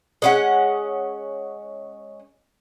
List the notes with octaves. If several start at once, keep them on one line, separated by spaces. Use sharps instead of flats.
G#3 C#4 F#5